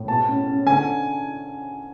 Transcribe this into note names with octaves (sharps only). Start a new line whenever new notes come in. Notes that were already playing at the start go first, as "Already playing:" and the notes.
Already playing: A2
B2 A5
C#4
C#4
D3 G#5